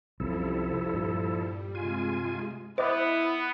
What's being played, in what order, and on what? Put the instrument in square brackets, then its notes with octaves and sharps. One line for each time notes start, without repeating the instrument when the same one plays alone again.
[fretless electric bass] C2 F#2 [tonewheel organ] F3 E4 A4 [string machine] G3
[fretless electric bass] G2 A#2
[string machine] C3 G#3 [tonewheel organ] F4 G#5
[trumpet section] B3 [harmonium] E4 [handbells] C5 D#5 D6